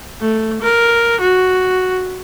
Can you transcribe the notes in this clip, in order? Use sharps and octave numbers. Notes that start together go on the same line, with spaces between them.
A3
A#4
F#4